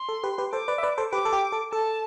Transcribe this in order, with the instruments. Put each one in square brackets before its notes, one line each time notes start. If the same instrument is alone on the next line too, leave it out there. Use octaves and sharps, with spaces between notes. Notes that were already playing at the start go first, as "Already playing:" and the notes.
Already playing: [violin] C6
[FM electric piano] A4
G4 B4
G4 B4
[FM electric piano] A4 C5 [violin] D6
[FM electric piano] B4 D5
E5
B4 D5
A4 C5
[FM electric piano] G4 B4 [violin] D6
[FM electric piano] A4
G4
A4
[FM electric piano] A4 [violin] A5